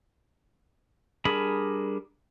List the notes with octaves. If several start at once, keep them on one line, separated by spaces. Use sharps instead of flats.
G3 D4 G#4 A#4 B5